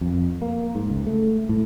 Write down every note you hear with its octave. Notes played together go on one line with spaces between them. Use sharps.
F2
A#3
G#2
C#2
A3
A2